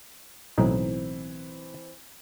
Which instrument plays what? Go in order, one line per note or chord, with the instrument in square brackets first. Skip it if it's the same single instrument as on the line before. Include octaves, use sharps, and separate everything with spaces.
[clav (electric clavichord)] B1 A2 D#4 [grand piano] E3 C4